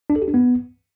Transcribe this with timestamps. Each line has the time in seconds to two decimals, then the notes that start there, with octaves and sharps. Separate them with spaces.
0.10 D4
0.16 A4
0.22 G4
0.28 D4
0.34 B3